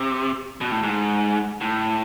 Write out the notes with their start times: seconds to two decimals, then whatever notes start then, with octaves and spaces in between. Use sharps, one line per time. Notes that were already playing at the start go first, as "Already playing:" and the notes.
Already playing: C3
0.61 B2
0.71 A2
0.83 G#2
1.61 A2